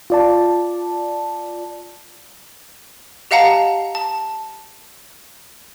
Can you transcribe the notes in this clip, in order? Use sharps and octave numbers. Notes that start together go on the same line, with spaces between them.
F4 D5 A5
G4 D#5 F5 F#5 A5 A#5
A5